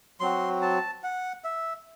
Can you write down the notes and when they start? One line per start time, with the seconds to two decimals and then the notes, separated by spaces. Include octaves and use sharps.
0.20 F#3 C4 F#4 C6
0.62 A5
1.04 F#5
1.44 E5